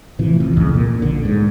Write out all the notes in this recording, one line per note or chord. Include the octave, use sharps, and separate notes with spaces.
A2 C3 E3 F3
A1 C3
C2 F2 C#3
A#2
B1 D3
G#2